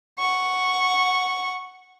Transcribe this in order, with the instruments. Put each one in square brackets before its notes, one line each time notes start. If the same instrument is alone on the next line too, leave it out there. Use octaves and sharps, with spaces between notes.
[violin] F#5 C#6